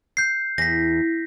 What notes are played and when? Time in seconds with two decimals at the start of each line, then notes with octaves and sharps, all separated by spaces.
0.17 G6 C7
0.58 E2 A#6 B6